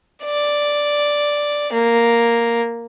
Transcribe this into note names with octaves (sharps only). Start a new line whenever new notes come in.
D5
A#3